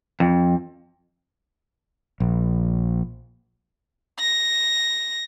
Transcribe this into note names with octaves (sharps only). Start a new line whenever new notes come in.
F2
A#1
A#6